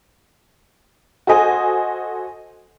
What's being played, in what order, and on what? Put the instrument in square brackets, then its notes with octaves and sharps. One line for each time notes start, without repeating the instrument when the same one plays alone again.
[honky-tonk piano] F#4 A4 C5 D#5 G#5